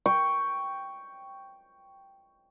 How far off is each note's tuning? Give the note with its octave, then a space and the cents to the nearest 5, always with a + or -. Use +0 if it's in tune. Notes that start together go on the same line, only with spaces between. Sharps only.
G5 +0 C#6 +5